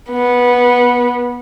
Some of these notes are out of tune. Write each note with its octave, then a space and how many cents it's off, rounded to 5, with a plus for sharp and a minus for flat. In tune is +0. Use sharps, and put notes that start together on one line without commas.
B3 -15